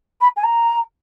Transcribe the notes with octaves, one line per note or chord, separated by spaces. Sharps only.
B5
G#5
A#5